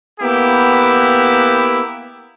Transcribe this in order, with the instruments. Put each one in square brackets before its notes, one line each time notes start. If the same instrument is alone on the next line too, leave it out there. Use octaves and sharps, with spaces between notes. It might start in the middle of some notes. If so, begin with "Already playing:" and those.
[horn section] A#3 B3 E4 G4